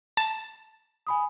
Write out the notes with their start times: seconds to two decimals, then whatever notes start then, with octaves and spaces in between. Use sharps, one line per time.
0.17 A5
1.07 G#5 B5 D#6